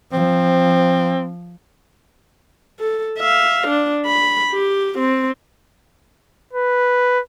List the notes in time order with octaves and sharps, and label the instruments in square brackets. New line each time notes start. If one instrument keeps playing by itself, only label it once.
[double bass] F3 [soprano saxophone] C4
[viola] A4
E5 F5
D4
B5
G4
C4
[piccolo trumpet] B4